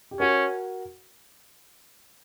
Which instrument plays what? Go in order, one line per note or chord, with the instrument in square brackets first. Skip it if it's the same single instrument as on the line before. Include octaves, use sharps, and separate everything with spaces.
[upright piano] G4
[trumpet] C#4 [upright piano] F#4 A#4